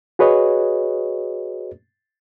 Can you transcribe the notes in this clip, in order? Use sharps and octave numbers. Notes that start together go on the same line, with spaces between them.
F#4 G#4 B4 C#5 D#5